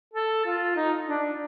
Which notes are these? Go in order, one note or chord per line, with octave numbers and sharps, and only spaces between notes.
A4
F4
D#4
D4